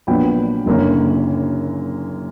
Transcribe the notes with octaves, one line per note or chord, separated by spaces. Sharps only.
A#1 A#2 F#3 B3 D4 G5 B5
F#1 F#2 D3 A#3 C#4